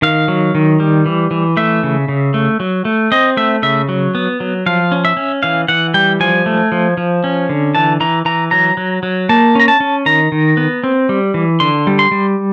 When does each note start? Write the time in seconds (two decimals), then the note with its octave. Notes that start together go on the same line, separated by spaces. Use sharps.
0.02 D#3 F5
0.28 F#3
0.55 D#3
0.80 G3
1.06 E3
1.31 E3
1.57 A3 E5
1.83 C#3
2.09 C#3
2.34 A3
2.60 F#3
2.85 A3
3.12 C4 D#5
3.37 A3 E5
3.63 C#3 E5
3.89 F#3
4.15 B3
4.40 F#3
4.66 F3 F5
4.92 C#4
5.05 E5
5.17 C#4
5.43 E3 F5
5.68 E3 F#5
5.94 G3 G5
6.20 F3 G#5
6.46 A3
6.72 F3
6.97 F3
7.24 C#4
7.49 D3
7.75 E3 A5
8.00 E3 A#5
8.25 E3 A#5
8.51 F#3 A#5
8.77 F#3
9.03 F#3
9.29 A#3 A5
9.55 C#4 A#5
9.68 A5
9.80 C#4
10.06 D#3 A#5
10.32 D#3
10.57 B3
10.84 C4
11.09 G3
11.34 E3
11.60 D3 C6
11.87 G3
11.99 C6
12.11 G3